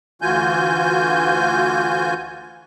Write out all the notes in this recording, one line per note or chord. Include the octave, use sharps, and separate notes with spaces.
D2 E3 F4 F#4 G#5 G6